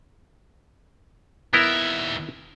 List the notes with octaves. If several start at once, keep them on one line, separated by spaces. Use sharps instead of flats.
D#2 B3 E4 A#4 E5